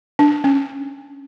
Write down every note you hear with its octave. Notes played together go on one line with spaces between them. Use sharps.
D4
C#4